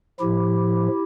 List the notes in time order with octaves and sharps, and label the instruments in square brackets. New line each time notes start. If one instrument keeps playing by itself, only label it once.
[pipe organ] A2 F3 E4 G4